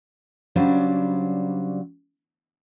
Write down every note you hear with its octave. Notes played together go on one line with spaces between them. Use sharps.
C#3 F#3 G3 D4 C5